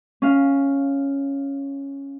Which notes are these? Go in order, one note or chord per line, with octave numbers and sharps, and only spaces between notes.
C#4 F5